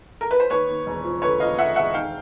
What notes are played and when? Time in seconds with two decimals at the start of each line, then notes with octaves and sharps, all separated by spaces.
0.21 A#4
0.31 B4
0.40 C5
0.50 D#2 B4 C#5
0.69 D#2
0.86 E1
1.04 F3
1.22 D3 B4 C#5
1.40 F3 D#5 F5
1.58 D3 E5 F#5
1.76 E1 E5 F#5
1.94 D#3 F5 G5